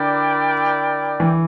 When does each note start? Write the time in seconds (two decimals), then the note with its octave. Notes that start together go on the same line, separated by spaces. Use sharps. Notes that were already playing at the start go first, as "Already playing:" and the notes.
Already playing: D3 E4 A#4 D5 G5
1.20 E3